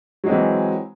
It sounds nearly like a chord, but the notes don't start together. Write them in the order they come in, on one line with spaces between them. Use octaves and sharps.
F#3 G#3 C4 E3